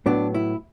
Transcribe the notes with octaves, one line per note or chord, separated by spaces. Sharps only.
A2 F#3 B3 D4
E4